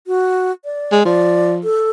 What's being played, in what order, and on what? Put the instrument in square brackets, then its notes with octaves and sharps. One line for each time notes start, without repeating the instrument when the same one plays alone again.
[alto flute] F#4
D5
[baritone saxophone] G#3
[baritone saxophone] F3 [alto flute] D5
[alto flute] A4